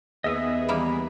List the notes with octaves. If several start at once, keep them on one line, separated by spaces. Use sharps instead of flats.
D#2 B3 G#4 D#5 E5 D#6
E3 G3 A#3